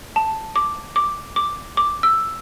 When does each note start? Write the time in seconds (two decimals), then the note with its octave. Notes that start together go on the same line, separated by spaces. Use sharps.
0.16 A5
0.56 D6
0.96 D6
1.36 D6
1.77 D6
2.03 E6